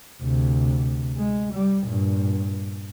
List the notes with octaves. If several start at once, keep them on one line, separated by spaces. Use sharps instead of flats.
D2 C3
G#3
G3
G2 A#2